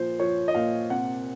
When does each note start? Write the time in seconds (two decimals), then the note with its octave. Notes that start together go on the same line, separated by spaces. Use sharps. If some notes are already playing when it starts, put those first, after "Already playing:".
Already playing: A#2 F3 C5
0.19 F3 C#5
0.48 D#5
0.55 A#2 F5
0.90 C3 F#5